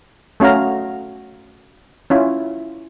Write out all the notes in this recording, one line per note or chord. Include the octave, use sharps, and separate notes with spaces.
A3 C#4 F#4 F5 A#5
C#4 E4 F4